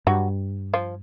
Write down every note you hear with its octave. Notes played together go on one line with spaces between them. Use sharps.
G2 F#3 F#4
F3 F4